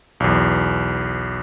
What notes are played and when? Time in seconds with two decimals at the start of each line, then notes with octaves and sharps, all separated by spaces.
0.20 B1 E2